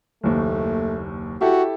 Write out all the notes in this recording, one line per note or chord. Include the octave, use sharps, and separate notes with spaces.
F#1 D#2 A3
E4 F#4 G4 A4